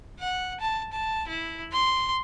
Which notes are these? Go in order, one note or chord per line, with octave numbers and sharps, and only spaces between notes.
F#5
A5
A5
E4
C6